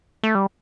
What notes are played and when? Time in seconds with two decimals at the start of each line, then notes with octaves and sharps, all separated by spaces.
0.23 A3
0.35 G3